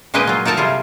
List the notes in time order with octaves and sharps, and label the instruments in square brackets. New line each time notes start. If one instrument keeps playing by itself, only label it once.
[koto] A#2 G#3 A#3 B4 D#5 G5
F#3 F4
D#4 A4 A#4 A5 A#5
C3 G3 F4 G#4